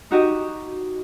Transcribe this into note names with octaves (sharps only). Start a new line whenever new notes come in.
D#4 F#4 G4 D#5